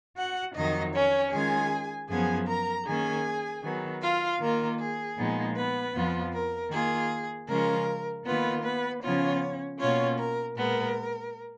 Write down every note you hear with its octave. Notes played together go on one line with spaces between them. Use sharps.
F#4 F#5
F2 D#3 F#3 D#4 D#5
C#4 C#5
D#3 G#3 C#4 F4 G#4 G#5
F#2 F3 B3 G#4 G#5
A#4 A#5
D#3 A#3 C#4 G#4 G#5
D#3 F#3 B3
F4 F5
D#3 A#3 F4 A#4
G#4
A#2 F3 G#3 B3 D#4
B3 B4
F2 F3 B3 F4
A#4
D#3 A#3 F4 G#4
C#3 F3 G#3 C#4 F4 A#4
D#3 A#3 B3 F4 B4
B3 B4
C#3 F3 B3 C#4 F4 C#5
B2 A#3 C#4 F4 C#5
A#4
A#2 G#3 B3 A#4